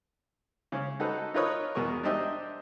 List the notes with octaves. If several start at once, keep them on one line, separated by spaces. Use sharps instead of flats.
C#3 C#4
D#4 F#4 A4 B4 C5
D#4 F4 A#4 B4 C#5 D#6
E2 B2 G#4 A#4 C#6
D4 D#4 G4 C5 D#5 E5